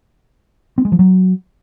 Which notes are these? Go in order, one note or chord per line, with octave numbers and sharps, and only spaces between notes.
C4
G#3
F3
F#3